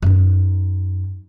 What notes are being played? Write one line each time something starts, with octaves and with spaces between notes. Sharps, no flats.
F#2 D#4